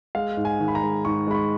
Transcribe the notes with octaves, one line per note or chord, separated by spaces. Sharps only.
G#3 F5
G#2
G#5
D#3
B5
A#5
G#3
G#2 C#6
G#3 B5
C#6